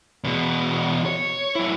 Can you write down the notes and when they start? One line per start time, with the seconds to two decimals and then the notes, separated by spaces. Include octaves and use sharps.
0.24 E2 B2
1.06 C#5
1.55 F#3 E4